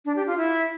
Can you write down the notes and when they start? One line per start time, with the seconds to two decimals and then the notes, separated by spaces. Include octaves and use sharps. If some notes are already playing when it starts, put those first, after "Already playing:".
0.05 D4
0.16 G4
0.27 F4
0.38 E4